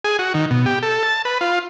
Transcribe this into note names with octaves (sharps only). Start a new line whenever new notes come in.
G#4
F#4
D#3
B2
G4
A4
A5
B4
F4